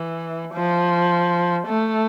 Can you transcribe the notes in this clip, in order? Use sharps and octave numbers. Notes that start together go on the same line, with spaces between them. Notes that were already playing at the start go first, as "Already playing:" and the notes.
Already playing: E3
F3
A3